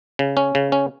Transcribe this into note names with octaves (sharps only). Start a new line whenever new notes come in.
C#3
C#4
C#3
C#4